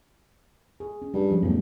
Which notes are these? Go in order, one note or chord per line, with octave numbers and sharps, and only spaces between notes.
G#4
C#4
G2 G3
F3 G#3 C#4
D1 B1 F2 A3